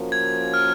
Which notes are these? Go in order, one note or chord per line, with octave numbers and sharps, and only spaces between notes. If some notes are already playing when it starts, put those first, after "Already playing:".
Already playing: F3 A#3 C#4 F#4 A#4
G#6
F6